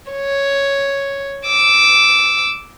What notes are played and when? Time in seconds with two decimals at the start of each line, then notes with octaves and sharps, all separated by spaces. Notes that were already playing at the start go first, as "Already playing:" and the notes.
0.12 C#5
1.47 D6 E6